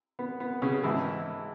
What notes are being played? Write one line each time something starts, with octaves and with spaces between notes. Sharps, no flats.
B3
B3
C#3 C#4
G#1 G#2 E3 E4